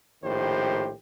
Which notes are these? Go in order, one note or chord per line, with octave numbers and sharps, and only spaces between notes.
A#1 A2 D#3 G4 C5